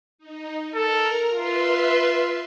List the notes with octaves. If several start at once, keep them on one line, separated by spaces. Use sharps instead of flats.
D#4
A4 A#4 A#5
F4 B4 E5 C6